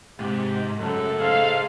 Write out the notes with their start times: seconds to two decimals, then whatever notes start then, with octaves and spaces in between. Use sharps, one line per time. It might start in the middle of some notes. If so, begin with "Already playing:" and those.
0.20 G#2 C3 G4
0.80 F#2 C#3 A3 A4
1.19 G#4 C5 F5